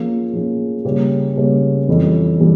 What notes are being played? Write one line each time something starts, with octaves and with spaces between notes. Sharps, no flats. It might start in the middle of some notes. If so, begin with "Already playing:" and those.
Already playing: F3 A#3 C#4 F4 G#4
F3 A#3 C#4 F4 G#4
C#3 G3 A#3 C#4 G4
C#3 G3 A#3 C#4 G4
F2 E3 G3 C#4
E3 G3